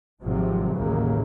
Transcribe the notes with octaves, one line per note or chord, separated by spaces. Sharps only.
G#1 G#2 C3 F3 F#3
A1 D#2 A2 C#3 F#3 A#3